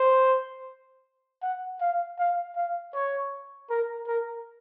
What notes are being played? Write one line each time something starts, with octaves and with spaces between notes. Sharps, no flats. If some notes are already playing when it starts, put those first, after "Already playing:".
Already playing: C5
F#5
F5
F5
F5
C#5
A#4
A#4